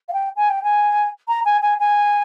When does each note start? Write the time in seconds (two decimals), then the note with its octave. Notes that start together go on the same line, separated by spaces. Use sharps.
0.08 F5
0.13 G5
0.36 G#5
0.49 G5
0.63 G#5
1.28 A#5
1.45 G#5
1.62 G#5
1.79 G#5